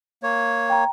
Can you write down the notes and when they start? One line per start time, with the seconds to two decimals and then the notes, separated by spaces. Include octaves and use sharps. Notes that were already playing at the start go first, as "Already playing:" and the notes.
0.23 A#3 C#5
0.70 G5 A#5